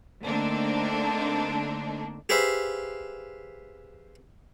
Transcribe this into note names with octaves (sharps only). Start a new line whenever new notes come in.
D3 A3 A#3 C4 D4 D#4
G4 G#4 B4 C5 E5 F5